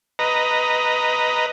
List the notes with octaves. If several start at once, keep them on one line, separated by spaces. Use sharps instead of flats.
B4 D#5 A#5